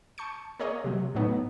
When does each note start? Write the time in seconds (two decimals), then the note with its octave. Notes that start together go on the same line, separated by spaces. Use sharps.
0.18 A5 C#6 G6 C#7
0.59 A#3 G#4 C#5 D#5
0.84 C3 F#3
1.15 A2 F#3 B3 D#4